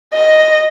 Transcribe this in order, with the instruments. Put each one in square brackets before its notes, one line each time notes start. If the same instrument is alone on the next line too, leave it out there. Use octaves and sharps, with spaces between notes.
[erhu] D#5